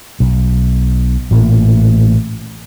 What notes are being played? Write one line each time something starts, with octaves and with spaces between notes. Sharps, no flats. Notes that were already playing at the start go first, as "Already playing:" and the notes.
B1
A1 A#2